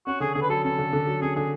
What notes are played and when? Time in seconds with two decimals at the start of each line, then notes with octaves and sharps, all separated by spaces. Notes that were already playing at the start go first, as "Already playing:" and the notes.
0.07 C#4 F#4
0.20 D3 G#4
0.34 D3 G#4
0.42 B4
0.49 F#3 A4
0.64 C#4 A4
0.78 D3
0.93 D3
1.07 F#3
1.22 C#4 G#4
1.35 D3 G#4